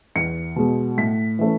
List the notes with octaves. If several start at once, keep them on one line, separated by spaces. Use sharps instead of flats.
E2 C#7
B2 G#3
A2 B6
E3 A3 C#4